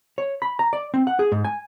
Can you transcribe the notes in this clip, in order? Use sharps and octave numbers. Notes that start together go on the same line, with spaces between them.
C#5
B5
A#5
D5
C4
F#5
G#4
G#2
G#5